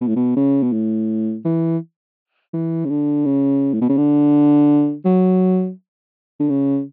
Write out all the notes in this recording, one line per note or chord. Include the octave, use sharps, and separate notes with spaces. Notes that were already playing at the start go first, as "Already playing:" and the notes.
B2
A2
B2
C#3
B2
A2
E3
E3
C#3
D3
C#3
A2
B2
C#3
D3
F#3
D3
C#3